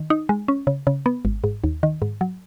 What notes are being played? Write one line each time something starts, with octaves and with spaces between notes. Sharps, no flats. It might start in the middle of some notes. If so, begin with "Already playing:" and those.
Already playing: D#3
D#4
G#3
C#4
C#3
C#3
B3
G#1
G#2
D#2
D#3
G#2
F#3